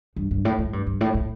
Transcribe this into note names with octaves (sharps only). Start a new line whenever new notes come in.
G2
G2
A2
A2
G2
G2
A2
A2